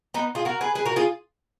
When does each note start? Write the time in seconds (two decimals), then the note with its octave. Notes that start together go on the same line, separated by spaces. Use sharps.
0.14 B3 D#4
0.35 F4 G#4
0.45 F#4 A#4
0.61 G#4 B4
0.75 G#4 B4
0.85 F#4 A#4
0.96 F4 G#4